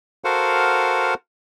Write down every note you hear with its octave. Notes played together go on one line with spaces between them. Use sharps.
F#4 A4 A#4 C5 F5 F#5